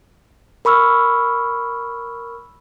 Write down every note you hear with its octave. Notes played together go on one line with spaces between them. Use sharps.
A#4 B5 C#6 E6 F6